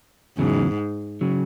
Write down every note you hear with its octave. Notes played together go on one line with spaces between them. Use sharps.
E2 G#2 C#3 F#3
C#3 F#3